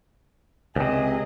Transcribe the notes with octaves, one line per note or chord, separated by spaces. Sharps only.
C#2 C3 G#4 D#5